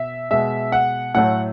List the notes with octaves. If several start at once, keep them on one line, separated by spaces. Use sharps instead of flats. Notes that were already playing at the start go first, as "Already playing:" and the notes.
Already playing: B2 E5
B2 G#3 E5
F#5
A2 F#3 A3 F#5